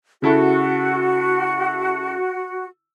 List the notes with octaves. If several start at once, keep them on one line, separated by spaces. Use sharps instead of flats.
C#3 E4 F#4 A4